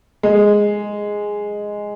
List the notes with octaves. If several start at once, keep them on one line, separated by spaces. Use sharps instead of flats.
G#3